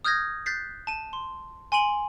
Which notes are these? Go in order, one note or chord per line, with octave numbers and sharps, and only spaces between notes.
D#6 F6 G6 G#6 A#6
F#6 G6 A6 B6 C7
A5 D#7
C6
G#5 C6 D7 D#7 F#7